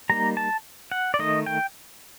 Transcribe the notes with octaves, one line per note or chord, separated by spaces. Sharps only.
G3 A#3 D#4 A#5
A5
F#5
D5
D#3 A3 D#4 D#5
G5